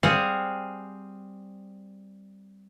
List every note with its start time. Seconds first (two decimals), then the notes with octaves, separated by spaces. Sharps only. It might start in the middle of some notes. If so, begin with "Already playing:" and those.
0.03 G3 C4 G#4 F5 F#5